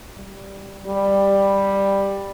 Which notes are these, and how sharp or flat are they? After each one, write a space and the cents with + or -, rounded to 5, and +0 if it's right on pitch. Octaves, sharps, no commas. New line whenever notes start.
G3 -5
G3 +10